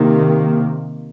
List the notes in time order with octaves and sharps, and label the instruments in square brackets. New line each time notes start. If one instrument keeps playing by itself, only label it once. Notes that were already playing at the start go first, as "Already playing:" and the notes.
Already playing: [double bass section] C3 D#3 A#3